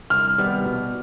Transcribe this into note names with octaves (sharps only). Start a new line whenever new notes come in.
C2 F6
C3 D#3 G3 B3
B2